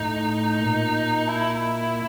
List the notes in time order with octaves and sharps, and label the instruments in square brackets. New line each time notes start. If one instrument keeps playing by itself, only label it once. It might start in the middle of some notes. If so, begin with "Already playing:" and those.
Already playing: [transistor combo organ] A2 [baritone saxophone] D#4
[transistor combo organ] A#2
[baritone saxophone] E4